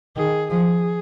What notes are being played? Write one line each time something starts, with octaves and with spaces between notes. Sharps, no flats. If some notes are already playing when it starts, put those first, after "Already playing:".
D#3 G#4
F3 G#4